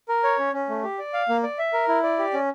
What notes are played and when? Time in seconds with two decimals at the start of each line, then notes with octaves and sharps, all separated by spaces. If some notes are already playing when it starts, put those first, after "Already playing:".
0.09 A#4
0.24 C#5
0.39 C#4
0.53 C#4
0.69 A3
0.83 G4
0.99 D5
1.14 F5
1.29 A#3
1.43 D5
1.59 E5
1.73 A#4
1.88 E4
2.03 D5
2.19 G4
2.34 C#4